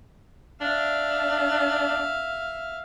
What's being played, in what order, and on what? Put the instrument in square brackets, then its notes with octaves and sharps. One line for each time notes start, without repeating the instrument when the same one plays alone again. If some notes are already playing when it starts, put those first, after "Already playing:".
[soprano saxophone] D4 [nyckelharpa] E5 F5